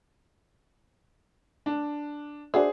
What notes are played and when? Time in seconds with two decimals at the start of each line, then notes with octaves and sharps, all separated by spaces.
1.66 D4
2.54 D4 F#4 G#4 C5 E5